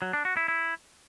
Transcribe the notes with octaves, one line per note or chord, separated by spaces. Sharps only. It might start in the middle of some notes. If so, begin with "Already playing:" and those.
F#3
D4
F#4
E4
E4